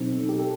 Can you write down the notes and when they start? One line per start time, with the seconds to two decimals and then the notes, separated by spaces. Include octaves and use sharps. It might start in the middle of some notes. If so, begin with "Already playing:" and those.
Already playing: B2 F#3 C4 D#4 A4
0.29 G4
0.39 A4